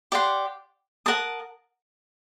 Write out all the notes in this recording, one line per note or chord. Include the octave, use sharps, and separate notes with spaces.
G4 D5 F#5 C6
A#4 F#5 A5 D#6